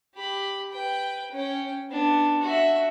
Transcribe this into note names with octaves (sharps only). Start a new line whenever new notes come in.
G4 B5
B4 G5
C#4 G5
B3 D4
F#4 E5